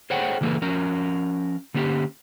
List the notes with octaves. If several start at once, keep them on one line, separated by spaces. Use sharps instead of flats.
G#4 A4 C5 C#5 F#5 G5
C#3 E3 A#3 G4 A4 B4
F3 C#4 A#4
D3 A#3 C#4 G4